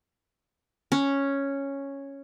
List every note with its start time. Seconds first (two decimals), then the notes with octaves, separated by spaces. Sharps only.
0.92 C#4